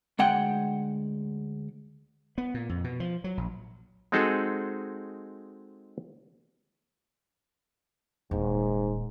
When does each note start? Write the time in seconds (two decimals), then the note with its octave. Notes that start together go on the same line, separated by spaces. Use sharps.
0.19 D2 G#3 F#5 G5
2.38 B3
2.54 A#2
2.69 F2
2.84 B2
3.00 F3
3.24 F#3
3.37 A#1
4.12 G#3 C4 D#4 F#4 G#4 A4
8.31 D#1 G#2